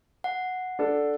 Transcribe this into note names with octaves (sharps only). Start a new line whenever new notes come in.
F#5
D4 A4